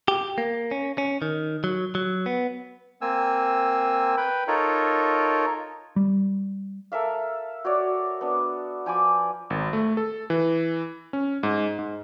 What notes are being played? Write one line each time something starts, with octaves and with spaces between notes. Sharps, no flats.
G4
A#3
C#4
C#4
D#3
F#3
F#3
B3
A#3 C4 G#5 E6
B4 G5 B5
D#4 F4 A4 A#4 C#5
G3
A4 A#4 E5 F5
F#4 C#5 D5
B3 D4
F3 G#5 B5 D6
G#1
A3
A4
E3
C#4
G#2
G#2